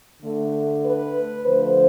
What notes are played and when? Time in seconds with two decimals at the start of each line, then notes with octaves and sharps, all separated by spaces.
0.23 D3 A3
0.85 B4
1.46 D3 F3 A3 C5